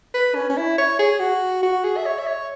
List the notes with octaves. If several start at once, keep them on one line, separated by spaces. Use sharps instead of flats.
B4
C#4
C#4
E4
C#5
G#4
F#4
F#4
G#4
E5
C#5
E5
C#5